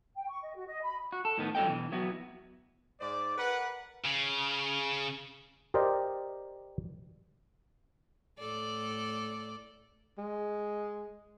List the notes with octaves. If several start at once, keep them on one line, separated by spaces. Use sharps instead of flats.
G5
C#6
D#5
F#4
D#5
B5
F#4
A4
A2 D#3 B3
G2 F#3 A4 D#5 G5
B2 E3
F#3 B3 E4 F#4
G#2 G#3 C5 D5
A#4 B4 F#5
C#3
G4 A#4 C5 D5 D#5 G5
A2 A4 D5
G#3